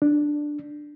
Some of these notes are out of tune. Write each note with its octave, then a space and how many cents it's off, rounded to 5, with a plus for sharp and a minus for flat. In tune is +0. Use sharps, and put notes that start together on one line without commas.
D4 +5